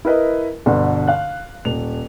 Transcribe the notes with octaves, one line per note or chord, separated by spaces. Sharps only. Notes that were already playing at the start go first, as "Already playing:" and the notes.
E4 A#4 B4 D#5
G1 B2 D3
F5 F#6
D#1 F7